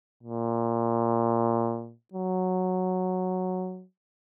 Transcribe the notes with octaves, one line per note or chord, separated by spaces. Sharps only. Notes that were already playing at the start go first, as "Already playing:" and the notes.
A#2
F#3